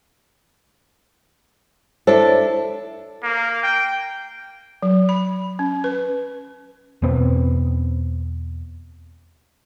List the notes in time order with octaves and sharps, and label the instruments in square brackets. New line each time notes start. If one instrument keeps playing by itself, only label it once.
[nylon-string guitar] D4 E4 A4 [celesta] C5 C#5
[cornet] A#3
G5
[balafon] F#3
B5
C#4
B4
[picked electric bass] E2 B2 B3 C4